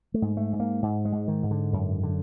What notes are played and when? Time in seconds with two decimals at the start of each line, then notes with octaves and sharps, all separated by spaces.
0.14 A3
0.22 G#2
0.37 A3
0.53 G#2
0.60 A#3
0.82 G#2
1.05 G#3
1.12 G#2
1.28 D#3
1.43 G#2
1.51 D3
1.73 F#2
2.03 D3